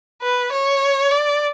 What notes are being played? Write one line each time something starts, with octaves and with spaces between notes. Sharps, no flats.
B4
C#5
D5